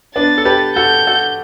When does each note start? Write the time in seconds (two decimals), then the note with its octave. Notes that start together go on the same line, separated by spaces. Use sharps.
0.16 B3 D4 A6
0.38 A4
0.45 G4 B4
0.76 F#4 A4 G6
1.07 F#4 A4